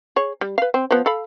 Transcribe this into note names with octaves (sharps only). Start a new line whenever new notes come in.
G#4 C#5
G3
B4 F5
C4
F3 B3
A4 F5 B5